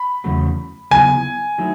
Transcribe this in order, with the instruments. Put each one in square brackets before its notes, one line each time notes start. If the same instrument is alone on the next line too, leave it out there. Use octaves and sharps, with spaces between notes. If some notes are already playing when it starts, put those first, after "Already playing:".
Already playing: [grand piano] B5
[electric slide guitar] E2 C#3 F#3 A3
[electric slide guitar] C#3 F#3 B3 E4 [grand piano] G#5
[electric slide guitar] D#3 F#3 A3 E4